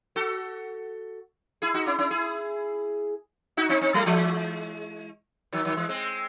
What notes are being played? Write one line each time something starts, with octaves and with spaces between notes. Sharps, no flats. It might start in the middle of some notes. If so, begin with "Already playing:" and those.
F#4 A4
E4 G#4
D#4 F#4
C#4 E4
C#4 E4
E4 G#4
D#4 F#4
C4 D#4
C4 D#4
F#3 A3
E3 G#3
D#3 F#3
D#3 F#3
E3 G#3
G#3 C4